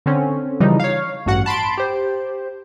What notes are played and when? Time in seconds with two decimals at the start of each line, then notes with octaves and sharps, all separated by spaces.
0.06 D3 C4 C#4
0.60 C#3 E3 F3 G3 D#4
0.80 C#5 F5
1.26 A1 G2 F#4 F#5
1.46 A5 B5 C6 D7
1.78 G4 C5